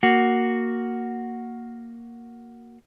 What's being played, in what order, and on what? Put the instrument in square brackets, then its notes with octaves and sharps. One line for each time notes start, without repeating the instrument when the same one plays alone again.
[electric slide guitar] A#3 F#4